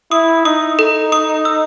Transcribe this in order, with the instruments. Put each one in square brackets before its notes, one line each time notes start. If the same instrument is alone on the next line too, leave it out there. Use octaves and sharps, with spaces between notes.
[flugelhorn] E4 [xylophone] D#6
[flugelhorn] D#4 [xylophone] D#6
[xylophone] A4
D#6
E6